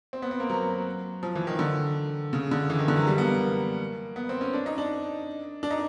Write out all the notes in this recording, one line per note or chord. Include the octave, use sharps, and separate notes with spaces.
C4
B3
C4
A#3
F#3
F3
E3
D#3
D3
C#3
D3
E3
D#3
D3
F#3
G3
B3
A#3
B3
C4
C#4
D4
D#4
D4
D4
D#4